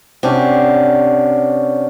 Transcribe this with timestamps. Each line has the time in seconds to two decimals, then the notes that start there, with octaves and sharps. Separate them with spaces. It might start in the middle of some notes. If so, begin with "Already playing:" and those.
0.23 C3 C#4 D4 F#5